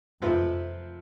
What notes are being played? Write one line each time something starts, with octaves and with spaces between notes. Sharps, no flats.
F2 C3 F3 C4 F4 B4